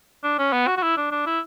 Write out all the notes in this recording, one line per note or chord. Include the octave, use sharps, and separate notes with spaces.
D4
C#4
B3
F#4
F#4
E4
D4
D4
E4